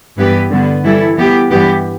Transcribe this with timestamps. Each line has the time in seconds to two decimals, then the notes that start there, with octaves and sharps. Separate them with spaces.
0.17 G2 E3 B3 G4 B4
0.50 G2 D3 B3
0.84 E3 G3 E4 A4
1.16 E3 B3 G4
1.50 G2 E3 B3 G4